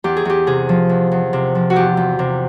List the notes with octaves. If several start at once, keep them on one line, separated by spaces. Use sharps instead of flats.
E2 G4
G#4
E2 G4
C3 G#4
F3
E2
E2
C3
F3
F#4
E2 G4
E2
C3